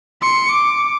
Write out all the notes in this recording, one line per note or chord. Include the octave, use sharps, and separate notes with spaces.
C6 C#7
D6